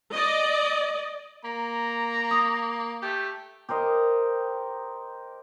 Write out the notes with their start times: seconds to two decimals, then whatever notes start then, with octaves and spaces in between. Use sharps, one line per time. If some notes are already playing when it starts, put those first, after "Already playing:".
0.12 D5 D#5
1.44 A#3 A#5
2.31 D#6
3.02 A3 G4
3.69 G4 A#4 C5 D#5